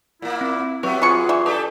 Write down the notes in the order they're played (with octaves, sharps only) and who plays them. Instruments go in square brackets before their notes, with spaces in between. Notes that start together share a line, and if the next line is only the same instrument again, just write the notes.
[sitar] A#2 A#3 [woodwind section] E4
[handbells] C4
[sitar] F#3 B3 [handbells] C4 B4 C#6 [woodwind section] G4 E5
[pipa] E3 C#6 [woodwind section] F4 G#4 [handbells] F#6
[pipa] E3 [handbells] D5
[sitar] D4 G4 A4 [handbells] B4 A5 D#6